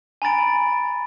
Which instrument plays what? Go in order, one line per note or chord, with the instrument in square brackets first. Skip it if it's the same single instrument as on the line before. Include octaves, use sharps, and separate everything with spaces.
[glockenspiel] G#5 A#5 B5 A6 D7